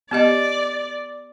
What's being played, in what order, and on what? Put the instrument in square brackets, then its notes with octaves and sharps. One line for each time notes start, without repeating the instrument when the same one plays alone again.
[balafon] B3 G4 D#5 [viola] D5